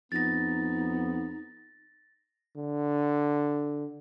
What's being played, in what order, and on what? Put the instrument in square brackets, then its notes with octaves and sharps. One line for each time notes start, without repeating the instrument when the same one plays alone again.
[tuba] F2 [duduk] B3 [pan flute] D#4 [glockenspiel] A6 A#6
[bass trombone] D3